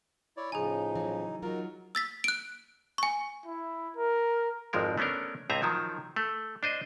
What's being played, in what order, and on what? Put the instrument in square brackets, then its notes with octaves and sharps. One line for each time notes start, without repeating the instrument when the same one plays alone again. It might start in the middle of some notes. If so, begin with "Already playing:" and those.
[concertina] E4 C#5 D5
[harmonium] A2 C#3 F3 [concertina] D#4 [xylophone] G#4 G#5
[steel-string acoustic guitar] E3 F#3
[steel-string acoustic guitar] F#3 F4 [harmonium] D#4 F#4 [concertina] A#4
[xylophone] E6 A6 B6
F#6 D7
G#5 C#6
[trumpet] E4
A#4
[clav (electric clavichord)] G#1 F2 F3 G#3 A#4
A3 B3 C#4 D4 A#4
C#2 A2 C4 G#4 E5 A#5
D#3 F3 F#3
A3
D4 C5 D#5